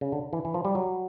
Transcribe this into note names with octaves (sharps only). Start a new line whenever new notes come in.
C#3
D3
E3
E3
F3
G3
F#3